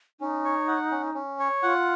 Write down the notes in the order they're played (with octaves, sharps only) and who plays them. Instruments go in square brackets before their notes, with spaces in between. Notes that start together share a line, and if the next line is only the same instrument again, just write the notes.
[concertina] C#4 [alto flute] D#4
[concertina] C#5
F#5
C#4
C#4
C#5
[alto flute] F4 [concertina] F#5